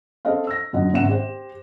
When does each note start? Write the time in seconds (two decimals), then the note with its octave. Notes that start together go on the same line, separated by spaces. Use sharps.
0.25 C4 A4 C5 D#5 F5
0.47 E6 A#6
0.73 F#2 A#2 D3 D#5 F#5
0.93 G#1 C#2 E5 F#5 E7
1.09 G4 C5